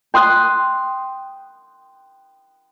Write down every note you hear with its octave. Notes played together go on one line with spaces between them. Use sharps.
G5 C6 D#6 F#6